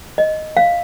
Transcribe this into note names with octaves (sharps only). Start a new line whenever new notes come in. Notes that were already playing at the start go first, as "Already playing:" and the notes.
D#5
F5